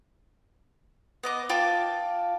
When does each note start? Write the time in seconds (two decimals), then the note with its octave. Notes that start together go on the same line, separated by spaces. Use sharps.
1.23 B3 D#5 D6
1.49 F4 G5 A5 D6